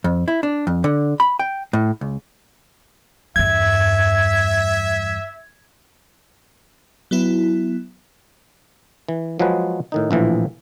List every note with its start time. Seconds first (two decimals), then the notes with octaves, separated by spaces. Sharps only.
0.04 F2
0.28 E4
0.43 D4
0.67 F2
0.84 D3
1.20 B5
1.39 G5
1.73 A2
2.01 C#2
3.36 E2 G2 E5 G#6
7.11 F#3 B3 E4
9.09 E3
9.39 F3 F#3 G#3 G#4 B4
9.92 A2 D#3 D#4
10.11 A#1 A2 E3 F3